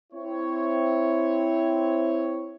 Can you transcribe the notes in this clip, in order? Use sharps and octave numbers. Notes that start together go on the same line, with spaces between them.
C4 E4 C#5